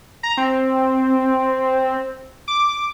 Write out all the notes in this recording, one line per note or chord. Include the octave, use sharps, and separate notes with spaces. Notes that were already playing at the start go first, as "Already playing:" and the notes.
A#5
C4
D6